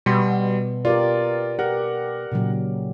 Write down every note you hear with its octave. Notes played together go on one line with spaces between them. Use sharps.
B2 G3 C6
F4 G4 A#4 D5
G4 A#4 F#5
A#2 C#3 F#3